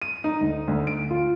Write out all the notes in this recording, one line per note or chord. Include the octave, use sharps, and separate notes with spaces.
D#7
D#4
D2
D2
D7
F4